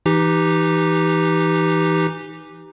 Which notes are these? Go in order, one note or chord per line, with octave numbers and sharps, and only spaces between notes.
E3 D#4 G4